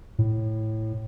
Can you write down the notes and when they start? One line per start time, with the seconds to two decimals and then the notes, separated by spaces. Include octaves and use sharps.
0.19 A2